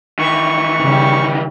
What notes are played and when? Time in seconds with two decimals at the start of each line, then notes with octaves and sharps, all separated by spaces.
0.19 D#3 E3 C#6
0.81 C#3 G3